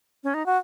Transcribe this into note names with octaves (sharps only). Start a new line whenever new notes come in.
C#4
D#4
F#4